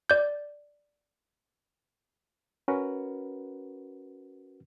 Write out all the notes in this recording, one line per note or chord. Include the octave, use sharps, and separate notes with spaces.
D5 G6
C#4 F#4 A#4 B4